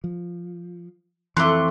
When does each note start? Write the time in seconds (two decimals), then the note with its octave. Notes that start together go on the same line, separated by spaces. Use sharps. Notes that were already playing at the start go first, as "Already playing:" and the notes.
0.04 F3
1.37 F2 E3 A3 C4 C6 D6 F#6